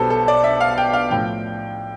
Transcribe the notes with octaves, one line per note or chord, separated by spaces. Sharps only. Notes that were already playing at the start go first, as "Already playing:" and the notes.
Already playing: B1 B2 G3 B3 A4 C5
A4
D5
E5
F5
G5
F5
A2 F3 G5